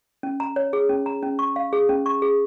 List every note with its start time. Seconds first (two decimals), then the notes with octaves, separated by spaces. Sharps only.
0.23 C#4
0.40 A#5
0.56 C#5
0.73 G#4
0.89 C#4
1.06 A#5
1.23 C#4
1.39 C#6
1.56 F5
1.73 G#4
1.89 C#4
2.06 C#6
2.22 G#4